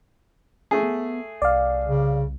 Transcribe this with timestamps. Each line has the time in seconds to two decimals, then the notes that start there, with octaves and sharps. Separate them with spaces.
0.71 A3 C#4 G#4
0.83 B3
1.42 C2 D5 F5
1.84 C#3